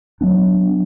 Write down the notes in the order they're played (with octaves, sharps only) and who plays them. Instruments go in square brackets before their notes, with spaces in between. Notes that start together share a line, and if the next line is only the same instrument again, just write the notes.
[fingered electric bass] F#3 B3 D4